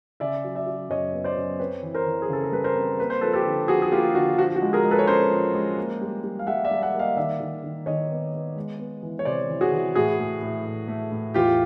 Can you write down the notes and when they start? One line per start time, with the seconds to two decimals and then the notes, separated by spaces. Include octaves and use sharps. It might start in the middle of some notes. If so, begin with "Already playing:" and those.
0.20 C#3 D5 E5
0.44 F#3
0.55 D5 E5
0.66 F#3
0.89 F#2 C#5 D#5
1.14 B3
1.24 C5 D5
1.36 F#2
1.59 C4 B4 C#5
1.83 E3
1.94 A#4 C5
2.07 E3
2.22 G#4
2.29 C#3 A4
2.44 A#4
2.52 G3 B4
2.64 A#4 C5
2.76 C4
2.99 A#3 B4
3.10 C5
3.21 F3 A4 B4
3.33 G4 A4
3.45 D3
3.68 F3 F#4 G#4
3.82 G#4
3.92 A#3 F4 G4
4.15 D3 F#4
4.38 F3 F#4
4.56 F#4
4.62 G#3
4.73 G#4 A#4
4.84 G#3
4.91 A4 B4
4.99 C#5
5.07 C#4 A#4 C5
5.31 F3
5.54 G#3
5.78 A#3
6.01 G3
6.24 G3
6.39 F5
6.47 G3 E5 F#5
6.64 D5 E5
6.71 G3
6.82 E5 F#5
6.94 A#3
6.99 D#5 F5
7.17 D#3 D5 E5
7.40 D#3
7.64 D#3
7.86 D#3 C#5 D#5
8.10 B3
8.34 B3
8.56 G#3
8.79 B3
9.03 E3
9.19 C#5
9.25 C3 C5 D5
9.49 E3
9.61 F#4 G#4
9.72 E3
9.95 A2 F#4 G#4
10.19 A2
10.42 A2
10.65 A2
10.88 A3
11.11 A2
11.34 E2 F4 G4